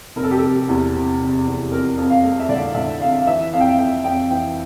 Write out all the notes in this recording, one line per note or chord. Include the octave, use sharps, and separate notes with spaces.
F1 A#4
A4
G4
F1 A4
G4
E2
C3
F1
E2
F2 A#4
F2
F5
A3
E5
D3 D5
D3 E5
F2 F5
F5
E3 E5
F2 F5
G5
F5
F2 G5
F2 G5
E3 G5